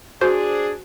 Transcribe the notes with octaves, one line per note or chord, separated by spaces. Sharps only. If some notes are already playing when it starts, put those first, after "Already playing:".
D4 F#4 G#4 C5